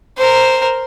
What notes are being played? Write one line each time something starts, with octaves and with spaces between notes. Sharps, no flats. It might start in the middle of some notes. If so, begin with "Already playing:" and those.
A#4 C5